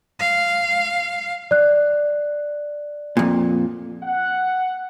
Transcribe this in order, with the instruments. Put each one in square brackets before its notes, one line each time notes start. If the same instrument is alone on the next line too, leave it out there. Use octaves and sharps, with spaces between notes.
[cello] F5
[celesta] D5 F#6
[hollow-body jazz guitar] F2 A#2
[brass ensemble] F#5